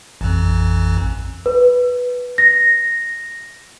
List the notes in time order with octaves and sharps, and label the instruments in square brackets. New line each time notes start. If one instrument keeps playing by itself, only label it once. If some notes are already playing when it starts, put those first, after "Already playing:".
[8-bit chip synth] A1 F2
[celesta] B4
A#6